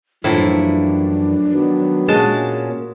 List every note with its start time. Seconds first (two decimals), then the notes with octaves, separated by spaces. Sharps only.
0.24 F#2 A2 E3 F3 A#3 D4 E4
1.52 D#3 F#3 B3
2.08 A#2 G#3 A#3 C#4 F#4 A5